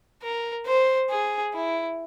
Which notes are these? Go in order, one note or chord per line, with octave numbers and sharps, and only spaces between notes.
A#4
C5
G#4
E4